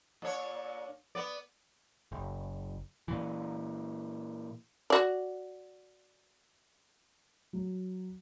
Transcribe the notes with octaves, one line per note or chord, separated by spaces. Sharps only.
A#2 D4 C#5
B3 D5
F#1
A#2 E3
F#4 D5
F#3